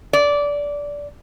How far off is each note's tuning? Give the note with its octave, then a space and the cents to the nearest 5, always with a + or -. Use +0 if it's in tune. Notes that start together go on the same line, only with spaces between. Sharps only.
D5 -15